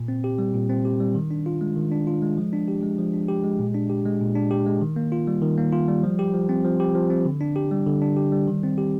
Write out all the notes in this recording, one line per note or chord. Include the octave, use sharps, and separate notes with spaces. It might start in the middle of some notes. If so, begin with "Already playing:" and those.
Already playing: A#2
C4
G4
G3
A#2
C4
G4
G3
D#3
D4
F4
G#3
D#3
D4
F4
G#3
F3
D4
G4
G#3
F3
D4
G4
G#3
A#2
D4
G4
G#3
A#2
D4
G4
G#3
D#3
A#3
F4
G3
D#3
A#3
F4
G3
F3
G4
F3
C4
F3
G4
F3
C4
D3
D4
G4
G3
D3
D4
G4
G3
D#3
C4
G4